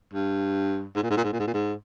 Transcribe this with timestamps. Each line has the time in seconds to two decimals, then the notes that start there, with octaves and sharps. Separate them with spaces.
0.14 G2
0.96 G#2
1.03 A#2
1.10 G#2
1.17 A#2
1.24 G#2
1.33 A#2
1.40 G#2
1.47 A#2
1.54 G#2